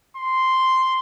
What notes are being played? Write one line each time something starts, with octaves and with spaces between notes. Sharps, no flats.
C6